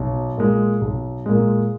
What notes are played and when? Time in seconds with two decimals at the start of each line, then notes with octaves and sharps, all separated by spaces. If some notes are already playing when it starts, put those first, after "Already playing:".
Already playing: B1
0.37 A#2 G#3
0.81 B1
1.26 A#2 G#3